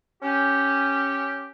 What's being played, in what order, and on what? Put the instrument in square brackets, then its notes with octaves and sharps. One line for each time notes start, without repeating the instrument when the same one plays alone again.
[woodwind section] C#4 G4